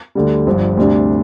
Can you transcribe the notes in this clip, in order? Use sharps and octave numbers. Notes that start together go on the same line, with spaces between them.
D2 D3 G3
G1 G2 F3
D2 C3 G3 D4